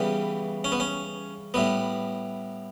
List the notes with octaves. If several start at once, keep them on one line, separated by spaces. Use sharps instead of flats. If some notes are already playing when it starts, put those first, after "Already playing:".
Already playing: C#3 E3 G3 B3 G4
C#4
B3
C#4
A2 G3 B3